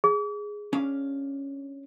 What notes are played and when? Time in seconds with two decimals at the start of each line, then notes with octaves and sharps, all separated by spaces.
0.04 G#4
0.73 C#4 D4 F5